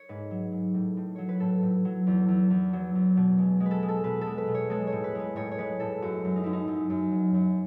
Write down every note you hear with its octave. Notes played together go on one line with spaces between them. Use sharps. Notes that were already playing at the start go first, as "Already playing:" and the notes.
Already playing: C#5
G#2 B4
F#3
G#2
A2
A2
F#3 C#5
B4
A2 A4
A2
F#3
E2
E2
E2
F#3
E2
B2
G#3
G#3
B4
A4
G#3
A4
B2 B4
G#3 A4
B4
B2
C#5
G#3 A4
C#5
A2
B4
G#3 B4
A2 C#5
C#5
G#3 B4
A2 A4
F#2 F#4
F#2
D#4
F#2 E4
D#4
F#2
F#2
F#3
F#2